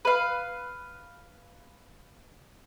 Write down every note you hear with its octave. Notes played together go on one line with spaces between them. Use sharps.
B4 F5